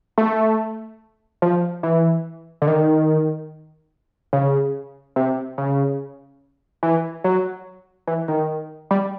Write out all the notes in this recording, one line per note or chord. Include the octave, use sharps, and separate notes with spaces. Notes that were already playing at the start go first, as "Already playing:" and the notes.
A3
F3
E3
D3
D#3
C#3
C3
C#3
E3
F#3
E3
D#3
G3